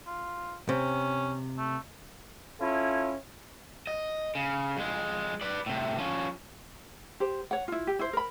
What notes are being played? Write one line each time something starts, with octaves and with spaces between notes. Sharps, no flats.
F4
C3 C#4
A3
C#4 E4 F4 A4
D#5
C#3
F2 G#3
B4 D5
A2 C3
F3 C#4
G4 C5
C#5 F#5
E4 F4
G4
E4 C5
A#4 B5